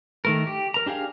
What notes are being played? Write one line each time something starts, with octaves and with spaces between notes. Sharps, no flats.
D#3 A3 A#4
G4
A#4 A#5
D4 G4 G#4 F5